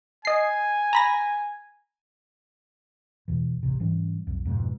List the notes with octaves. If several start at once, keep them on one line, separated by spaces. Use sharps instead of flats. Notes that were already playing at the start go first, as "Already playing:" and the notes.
D#5 G#5 C7
A#5 B5 A#6
E2 B2 E3
D#1 A1 C3
G#2 E3 G3 C#4
B1 F2
F2 G#2 B2